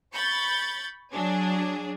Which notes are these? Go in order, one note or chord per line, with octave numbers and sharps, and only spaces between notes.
B5 C#6 G6 A6
F#3 D4 G#4